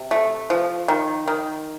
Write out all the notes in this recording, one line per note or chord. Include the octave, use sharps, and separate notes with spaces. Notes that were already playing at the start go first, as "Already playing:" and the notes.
Already playing: C3
A3
F3
D#3
D#3